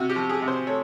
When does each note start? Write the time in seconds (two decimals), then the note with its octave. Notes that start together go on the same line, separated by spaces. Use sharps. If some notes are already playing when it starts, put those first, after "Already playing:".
Already playing: C3 F#4
0.09 G4
0.16 F3
0.29 G#4
0.42 C3
0.48 C5
0.67 A3 C#5